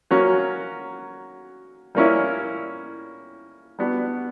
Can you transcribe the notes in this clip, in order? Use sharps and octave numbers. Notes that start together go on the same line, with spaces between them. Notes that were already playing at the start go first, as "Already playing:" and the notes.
F#3 A#3 C#4 F#4
G3 A#3 C#4 E4
G3 B3 D4 F#4